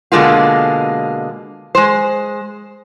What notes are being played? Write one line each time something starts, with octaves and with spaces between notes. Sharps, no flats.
B2 D3 G#3 A#3 F4
G#3 C5